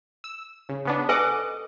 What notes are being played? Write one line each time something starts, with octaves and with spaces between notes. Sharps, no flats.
E6
C#3
C#3 B3 D4
A4 B4 D#5 F#5 G#5 D6